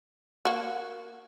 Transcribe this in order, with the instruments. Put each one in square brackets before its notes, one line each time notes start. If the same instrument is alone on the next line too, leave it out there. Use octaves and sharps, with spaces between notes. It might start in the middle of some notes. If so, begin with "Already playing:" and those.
[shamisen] A#3 F#4